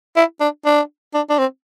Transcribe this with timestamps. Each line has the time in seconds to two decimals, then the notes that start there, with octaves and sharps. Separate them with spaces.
0.17 E4
0.41 D4
0.66 D4
1.14 D4
1.30 D4
1.38 C4